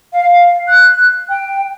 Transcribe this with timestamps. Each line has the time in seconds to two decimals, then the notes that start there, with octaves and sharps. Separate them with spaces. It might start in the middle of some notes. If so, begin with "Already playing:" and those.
0.13 F5
0.68 F#6
1.28 G5